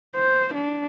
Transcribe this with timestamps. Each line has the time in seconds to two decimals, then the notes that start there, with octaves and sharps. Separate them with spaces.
0.16 C5
0.54 D4